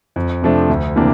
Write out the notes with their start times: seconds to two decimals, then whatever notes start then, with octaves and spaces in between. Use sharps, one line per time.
0.16 F2
0.42 C3 F3 A3 D4
0.70 D2
0.96 C3 E3 A#3 D4